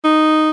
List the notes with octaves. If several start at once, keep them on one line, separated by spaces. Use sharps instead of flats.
D#4